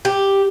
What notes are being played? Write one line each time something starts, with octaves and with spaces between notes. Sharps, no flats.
G4